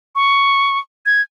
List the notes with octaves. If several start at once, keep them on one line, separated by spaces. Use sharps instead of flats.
C#6
G#6